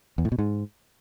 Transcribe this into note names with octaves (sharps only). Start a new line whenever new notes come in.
E2
A2
B2
G#2